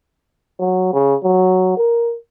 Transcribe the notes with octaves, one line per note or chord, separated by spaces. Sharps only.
F#3
C#3
F#3
A#4